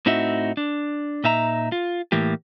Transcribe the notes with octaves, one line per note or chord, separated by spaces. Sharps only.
A2 C4 D#4 F#4 E5
D4
A#2 D#4 E5 A#5
F4
A2 E3 A#3 G4